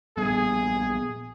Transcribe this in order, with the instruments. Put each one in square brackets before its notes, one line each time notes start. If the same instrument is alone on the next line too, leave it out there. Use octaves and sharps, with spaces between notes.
[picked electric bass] A#1 G3 B3 [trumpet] G#4